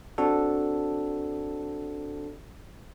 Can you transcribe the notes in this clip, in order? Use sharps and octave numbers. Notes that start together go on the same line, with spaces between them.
C4 D4 F#4 A4